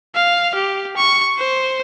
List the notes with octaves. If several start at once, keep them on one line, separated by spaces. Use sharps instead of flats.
F5
G4
C#6
C5